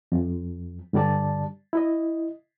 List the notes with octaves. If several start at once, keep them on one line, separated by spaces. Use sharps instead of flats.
F2
G2 D3 G3 D5 A5
E4 D#5